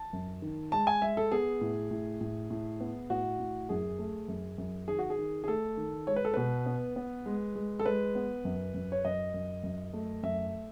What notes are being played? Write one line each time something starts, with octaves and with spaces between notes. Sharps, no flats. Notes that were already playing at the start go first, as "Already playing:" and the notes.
Already playing: A5
F#2
D#3
G#3 A5
G#5
G#3 E5
A4
B3 G#4
A2
A2
A2
A2
B3
A2 F#4
A2
F#2 G#4
A3
F#2
F#2
D#3 G#4
F#4
G#4
D#3
G#4
A3 A4
D#3
G#3 C#5
B4
A4
B2 B4
B3
B3
G#3
G#3
A4
G#3 B4
B3
F#2
F#2
C#5
F#2 D#5
F#2
F#2
A3
F#2 E5